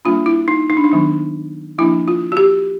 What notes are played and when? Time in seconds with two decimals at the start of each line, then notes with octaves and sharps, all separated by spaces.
0.05 G3 A#3 D4 F4
0.26 E4
0.48 D#4
0.70 D#4
0.77 D4
0.84 D#4
0.91 D#3 F#3 B3 D4
1.78 F3 A#3 D4 E4
2.08 F4
2.32 F#4
2.37 G4